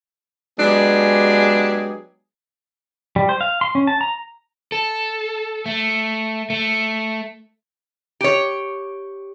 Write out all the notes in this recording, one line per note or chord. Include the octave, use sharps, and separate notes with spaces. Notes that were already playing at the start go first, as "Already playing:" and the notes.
F#3 G#3 B3 D4 G4 G#4
G3
C5
F5
C6
C#4
A5
A#5
A4
A3
A3
G4 C#5